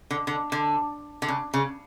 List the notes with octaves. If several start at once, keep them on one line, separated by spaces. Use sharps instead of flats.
D3
D3
D3
D3
C#3
C#3